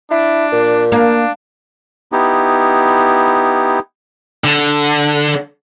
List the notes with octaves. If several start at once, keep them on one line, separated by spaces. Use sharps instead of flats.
D4 E4
A#2
A#3 D4
B3 D#4 E4 G4
D3